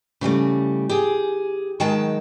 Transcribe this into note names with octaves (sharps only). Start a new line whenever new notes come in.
C#3 E3 G3 A3
G4 G#4
D#3 F#3 G#3 F#5 G5 A5